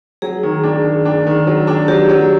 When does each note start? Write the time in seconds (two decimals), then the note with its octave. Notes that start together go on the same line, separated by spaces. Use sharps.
0.22 F#3 G#4
0.43 D#3
0.64 D4
0.85 D#3
1.05 D4
1.27 D#3
1.47 F#3
1.67 D4
1.88 F#3 G4
2.09 F#3